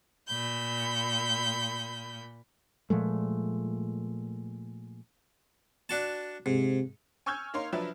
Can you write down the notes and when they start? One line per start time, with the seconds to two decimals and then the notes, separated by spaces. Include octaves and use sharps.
0.28 A#2 B5 G6
2.90 A#2 F3 G#3 A3
5.89 D4 F#4 A5
6.46 G#2 C3
7.26 G#5 C#6 E6 F6 G6 G#6
7.54 A#3 D#4 C#5 F5 C6
7.73 F3 F#3 D4 B4 E5